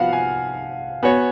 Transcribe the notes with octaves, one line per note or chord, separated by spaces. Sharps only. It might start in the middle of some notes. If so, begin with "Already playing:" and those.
Already playing: F3 B3 F#4 F5 F#5
G#5
B3 F#4 C#5 G#5